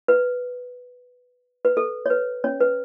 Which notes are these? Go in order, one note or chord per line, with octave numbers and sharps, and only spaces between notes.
B4
B4
A4
C#5
B4
C#4 C#5
B4